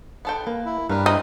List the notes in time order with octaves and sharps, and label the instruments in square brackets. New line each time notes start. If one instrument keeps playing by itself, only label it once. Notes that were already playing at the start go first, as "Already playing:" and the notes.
[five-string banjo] B3 A4 G5
[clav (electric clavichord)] A#3 [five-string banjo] B4
[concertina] E4
[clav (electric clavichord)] G2 [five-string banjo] G3 D4 [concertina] A#4 B4
[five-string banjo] C4 E4 A#5 [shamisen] D#4